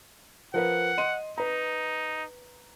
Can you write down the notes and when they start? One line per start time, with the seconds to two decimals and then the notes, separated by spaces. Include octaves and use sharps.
0.54 F3 A#4 B4 F#5
0.98 D#5 C6 D#7
1.38 D#4 B4 A#5